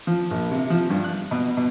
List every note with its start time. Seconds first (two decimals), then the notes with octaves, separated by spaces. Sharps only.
0.07 F3
0.31 A#1
0.51 C3
0.70 F3
0.90 G2
1.04 F#6
1.31 B2
1.57 B2